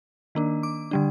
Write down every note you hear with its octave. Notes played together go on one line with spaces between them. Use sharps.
D#3 A#3 D4
D6
D3 G3 D4